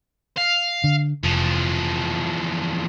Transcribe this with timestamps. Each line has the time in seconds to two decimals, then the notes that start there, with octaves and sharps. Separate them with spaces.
0.38 F5
0.84 D3
1.23 F1 E2 F3